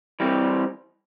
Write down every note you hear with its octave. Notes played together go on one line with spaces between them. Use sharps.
E3 G3 C4